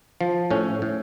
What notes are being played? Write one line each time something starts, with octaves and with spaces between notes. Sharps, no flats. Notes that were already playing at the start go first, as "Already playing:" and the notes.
F3
A2 C#4
A2